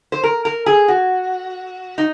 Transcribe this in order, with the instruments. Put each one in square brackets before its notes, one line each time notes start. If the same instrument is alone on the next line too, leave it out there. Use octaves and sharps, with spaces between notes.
[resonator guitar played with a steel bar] C5
A#4
A#4
G#4
F#4
D#4